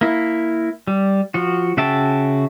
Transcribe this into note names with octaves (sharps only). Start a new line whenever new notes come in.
A#3 E4
G3
F3 F#4
C#3 F#4 E5 G5 A5